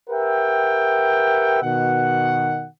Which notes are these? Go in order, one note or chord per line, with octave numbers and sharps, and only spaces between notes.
G4 A#4 B4 E5 F#5 G5
B2 D#3 F#5